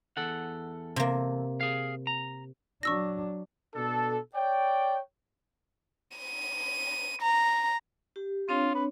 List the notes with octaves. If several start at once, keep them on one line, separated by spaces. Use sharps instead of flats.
E2 A4 F#5
C3 A#3
G#4 F5
A#5
F#3 D4 C#6 E6 A#6
B2 D4 A4
C#5 D5 G5
D#7
A#5
G4
C4 D4 F4 C#5
B4